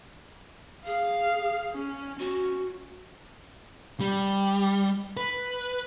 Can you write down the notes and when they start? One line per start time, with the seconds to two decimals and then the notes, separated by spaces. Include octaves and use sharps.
0.86 G#4 F5
1.73 C#4
2.19 C#4 F#4
4.01 G3
5.17 B4